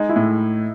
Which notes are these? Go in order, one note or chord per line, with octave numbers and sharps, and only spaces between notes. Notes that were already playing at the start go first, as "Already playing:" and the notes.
Already playing: G#3 D#4
E4
A2